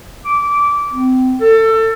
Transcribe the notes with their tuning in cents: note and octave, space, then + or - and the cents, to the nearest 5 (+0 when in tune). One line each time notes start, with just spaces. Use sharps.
D6 -15
C4 -30
A4 +25